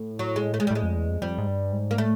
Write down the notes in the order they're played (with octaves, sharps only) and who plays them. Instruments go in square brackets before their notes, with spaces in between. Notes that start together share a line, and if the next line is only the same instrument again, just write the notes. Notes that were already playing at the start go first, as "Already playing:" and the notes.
Already playing: [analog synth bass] A2
[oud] F#3
G#3
A3
G#3
G3
[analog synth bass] A2 [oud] G#3
[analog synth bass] F2
E2
F2
[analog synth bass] F2 [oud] G3
[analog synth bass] G#2
G2
G#2
[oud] A#3
[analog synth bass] A2 [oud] A3